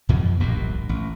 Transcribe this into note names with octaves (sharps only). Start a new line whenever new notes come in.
F2 B2 E3 F3
D1 A#1 G2 A#2
A1